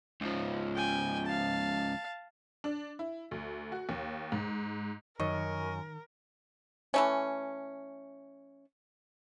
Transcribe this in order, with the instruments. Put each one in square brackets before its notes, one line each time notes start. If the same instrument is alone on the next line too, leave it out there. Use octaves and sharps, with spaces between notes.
[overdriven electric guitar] C#2 F3
[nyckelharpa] G5 G#5
F5 A5
[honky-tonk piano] D4
E4
D2
F#4
D#2
G#2
[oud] F#2 [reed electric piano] D#3 [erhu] A#4 [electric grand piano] D#5 C#6
[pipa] E3 A3 C#4